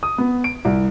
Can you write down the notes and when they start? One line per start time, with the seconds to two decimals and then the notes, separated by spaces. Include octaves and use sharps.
0.03 D#6
0.18 B3
0.44 D7
0.65 C2